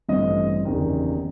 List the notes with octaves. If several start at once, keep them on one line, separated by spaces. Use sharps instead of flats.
A1 G2 E3 A3 C4 D#5
F#1 E2 C3 D#3